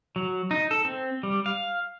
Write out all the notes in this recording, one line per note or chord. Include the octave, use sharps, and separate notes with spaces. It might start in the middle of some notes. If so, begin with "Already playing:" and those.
F#3
D#4
A4
C4
G3
F5